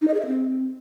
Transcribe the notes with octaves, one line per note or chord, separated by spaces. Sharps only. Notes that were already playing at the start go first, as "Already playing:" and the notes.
D#4
D#5
G#4
E5
C4